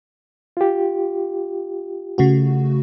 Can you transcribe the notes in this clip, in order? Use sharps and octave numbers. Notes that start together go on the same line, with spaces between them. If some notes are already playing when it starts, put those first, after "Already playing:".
F4 G4
C#3 A3 F#4